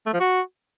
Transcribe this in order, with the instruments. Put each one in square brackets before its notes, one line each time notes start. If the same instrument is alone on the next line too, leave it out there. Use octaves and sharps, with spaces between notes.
[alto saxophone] A3
F3
F#4